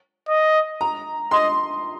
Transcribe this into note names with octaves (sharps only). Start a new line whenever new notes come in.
D#5
A#5
D#5 C6